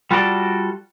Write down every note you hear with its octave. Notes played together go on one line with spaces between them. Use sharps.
G3 F4 F#4 A4 D5